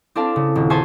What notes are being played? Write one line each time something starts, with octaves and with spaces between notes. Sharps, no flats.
C4 D4 E4 A4 F5 A5
C#3
D#1
G#4 C5 E5 G#5 A5 C#6